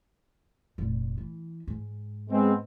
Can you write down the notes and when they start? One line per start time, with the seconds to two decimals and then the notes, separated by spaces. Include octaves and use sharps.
0.78 F1 A#2
1.18 E3
1.67 G#2
2.30 G#3 B3 C4